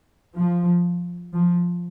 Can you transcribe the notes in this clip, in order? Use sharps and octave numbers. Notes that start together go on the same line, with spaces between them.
F3
F3